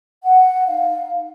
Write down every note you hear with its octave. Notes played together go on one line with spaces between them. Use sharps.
F#5
D#4 F5